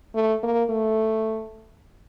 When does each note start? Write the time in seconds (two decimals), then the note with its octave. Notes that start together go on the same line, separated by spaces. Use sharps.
0.15 A3
0.43 A#3
0.70 A3